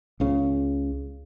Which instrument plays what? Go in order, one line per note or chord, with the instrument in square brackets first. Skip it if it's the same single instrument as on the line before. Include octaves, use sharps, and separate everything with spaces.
[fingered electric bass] C#2 C#3